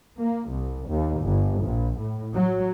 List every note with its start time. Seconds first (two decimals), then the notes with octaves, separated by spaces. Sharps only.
0.19 A#3
0.51 C2
0.89 D#2
1.23 G1
1.62 A#1
2.00 A2
2.35 F#3